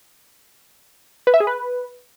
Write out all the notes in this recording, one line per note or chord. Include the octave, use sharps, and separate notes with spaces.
B4
E5
G#4
B4